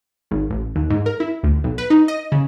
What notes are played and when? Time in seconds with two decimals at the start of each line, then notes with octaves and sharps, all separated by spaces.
0.31 G#1
0.50 A1
0.75 D#2
0.90 G#2
1.06 A#4
1.20 E4
1.43 D2
1.64 B1
1.78 B4
1.90 D#4
2.08 D#5
2.32 C#3